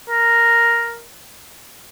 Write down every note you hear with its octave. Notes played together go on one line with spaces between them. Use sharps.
A#4